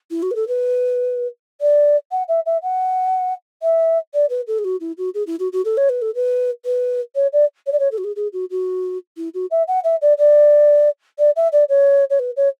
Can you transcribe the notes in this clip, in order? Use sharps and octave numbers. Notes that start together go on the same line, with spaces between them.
E4
F#4
B4
A4
B4
D5
F#5
E5
E5
F#5
E5
D5
B4
A4
G#4
F#4
E4
F#4
G#4
E4
F#4
F#4
A4
C#5
B4
A4
B4
B4
C#5
D5
C#5
D5
C#5
A4
F#4
G#4
G#4
F#4
F#4
E4
F#4
E5
F#5
E5
D5
D5
D5
E5
D5
C#5
C#5
B4
C#5